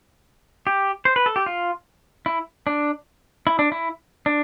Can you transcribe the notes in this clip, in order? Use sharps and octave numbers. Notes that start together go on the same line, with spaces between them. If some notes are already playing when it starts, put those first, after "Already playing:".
G4
C5
B4
A4
G4
F4
E4
D4
E4
D4
E4
D4